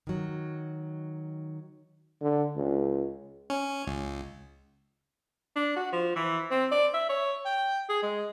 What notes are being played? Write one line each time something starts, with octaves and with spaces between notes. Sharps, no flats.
D#3 F#3
D3
C#2
C#4
C#2
D4
F#4
F3
E3
C4
D5
E5
C#5
G5
G#4
G#3